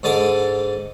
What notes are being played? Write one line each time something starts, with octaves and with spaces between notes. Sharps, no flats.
G#2 D3 D5 D#6